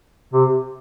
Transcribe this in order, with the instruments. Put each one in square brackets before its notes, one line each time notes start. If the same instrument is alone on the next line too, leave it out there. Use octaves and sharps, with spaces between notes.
[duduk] C3